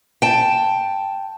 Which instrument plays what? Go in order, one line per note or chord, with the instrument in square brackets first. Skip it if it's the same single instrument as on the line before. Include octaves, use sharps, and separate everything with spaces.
[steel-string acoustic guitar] G5 A5